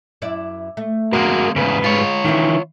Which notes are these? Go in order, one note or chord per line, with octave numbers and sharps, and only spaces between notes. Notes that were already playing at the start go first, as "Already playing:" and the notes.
F#2 E4 D5
A3
D3 G#3 A#3 B3 F#4 A#4
E2 G#2 C#3 B4
G#3 F4 C#5
D#3 E3 C#4 E4